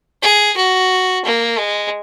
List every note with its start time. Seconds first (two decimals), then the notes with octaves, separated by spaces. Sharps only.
0.22 G#4
0.57 F#4
1.25 A#3
1.59 G#3